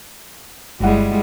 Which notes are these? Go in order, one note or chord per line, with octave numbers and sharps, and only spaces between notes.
G1 G3 G#3 E4 F#5